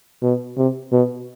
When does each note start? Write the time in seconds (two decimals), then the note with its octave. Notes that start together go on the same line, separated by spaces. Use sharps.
0.22 B2
0.57 C3
0.92 B2